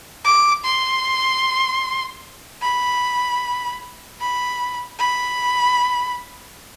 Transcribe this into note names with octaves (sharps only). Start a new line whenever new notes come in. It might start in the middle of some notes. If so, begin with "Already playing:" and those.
D6
C6
B5
B5
B5